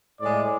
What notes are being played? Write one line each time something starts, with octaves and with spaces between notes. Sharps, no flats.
A2 G#3 D5